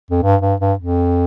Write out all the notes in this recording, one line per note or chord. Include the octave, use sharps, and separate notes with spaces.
F2
G2
G2
G2
F2